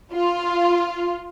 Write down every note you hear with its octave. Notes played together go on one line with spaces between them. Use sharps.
F4